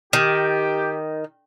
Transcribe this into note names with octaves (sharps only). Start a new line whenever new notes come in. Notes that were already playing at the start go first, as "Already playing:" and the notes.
D#3 G4